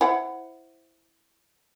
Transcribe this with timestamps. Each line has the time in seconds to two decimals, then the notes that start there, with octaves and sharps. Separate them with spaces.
0.01 E4 C5 F#5